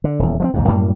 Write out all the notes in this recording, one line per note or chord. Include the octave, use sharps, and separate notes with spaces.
D3
D#1 E2
F3 G3 C4
A#1 D#2 G#2
F#2 A2 G3 A#3